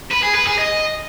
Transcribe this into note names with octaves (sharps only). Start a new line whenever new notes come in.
B4
G#4
B4
G#4
D#5